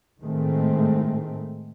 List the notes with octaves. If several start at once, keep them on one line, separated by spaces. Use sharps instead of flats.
A2 D#3 G#3 A3 C4